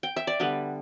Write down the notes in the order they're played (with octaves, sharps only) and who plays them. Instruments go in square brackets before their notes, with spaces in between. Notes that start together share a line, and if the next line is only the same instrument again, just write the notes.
[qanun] G5
E5
D5
D3 G3 B3 B4